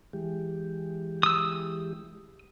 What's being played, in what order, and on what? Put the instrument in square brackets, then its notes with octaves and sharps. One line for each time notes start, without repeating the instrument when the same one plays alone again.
[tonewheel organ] E3 G#3 G4
[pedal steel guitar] D#6 E6